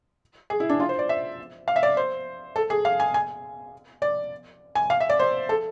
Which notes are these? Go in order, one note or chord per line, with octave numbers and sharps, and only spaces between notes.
G#4
E4
D4
F4
C5
D5
E5
F5
E5
D5
C5
A4
G#4
F5
G#5
G#5
D5
G#5
F5
E5
D5
C5
A4